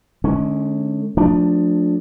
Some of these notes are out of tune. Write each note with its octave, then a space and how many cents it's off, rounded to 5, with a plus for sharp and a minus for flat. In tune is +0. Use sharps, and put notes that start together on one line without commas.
D3 +25 G#3 +35 C#4 +0
F3 +30 A3 +0 D4 +0